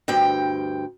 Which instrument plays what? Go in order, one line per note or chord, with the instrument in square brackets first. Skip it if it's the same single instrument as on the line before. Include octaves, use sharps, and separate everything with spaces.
[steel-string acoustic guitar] D2 G2 G5